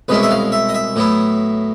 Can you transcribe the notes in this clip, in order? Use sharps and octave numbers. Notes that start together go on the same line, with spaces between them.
C2 B2 G#3 C#4 E4 B4
E5
F5
E5
D#5
E5
A2 F#3 B3 E4